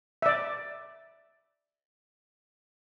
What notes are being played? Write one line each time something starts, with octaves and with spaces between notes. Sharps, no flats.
D5 E5